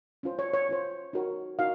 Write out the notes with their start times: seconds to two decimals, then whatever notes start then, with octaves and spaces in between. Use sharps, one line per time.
0.23 C#4 F4 C5
0.39 C#5
0.54 C#5
0.69 C#4 F4 C5
1.13 D#4 F#4 A#4 C#5
1.59 D#4 F#4 A#4 F5